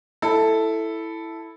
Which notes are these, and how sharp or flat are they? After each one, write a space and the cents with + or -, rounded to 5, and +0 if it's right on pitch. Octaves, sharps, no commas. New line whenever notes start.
E4 +0 A4 +0